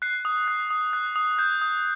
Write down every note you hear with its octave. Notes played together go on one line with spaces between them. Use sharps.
F#6 C7
D#6
F#6
D#6
F#6
D#6
F#6 G6
D#6